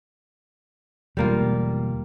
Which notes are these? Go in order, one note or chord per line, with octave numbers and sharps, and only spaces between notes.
E1 D3 G3 A#3 F4